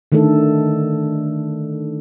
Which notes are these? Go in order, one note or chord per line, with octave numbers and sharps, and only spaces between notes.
D3 D#3 A3 D#4 A4